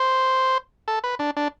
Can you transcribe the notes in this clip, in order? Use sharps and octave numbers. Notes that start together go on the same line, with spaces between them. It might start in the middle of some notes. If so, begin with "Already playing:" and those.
Already playing: C5
A4
B4
D4
D4